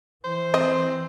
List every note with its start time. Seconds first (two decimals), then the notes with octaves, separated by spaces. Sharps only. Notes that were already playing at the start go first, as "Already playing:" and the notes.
0.24 E3 C5
0.54 C4 D#5 C6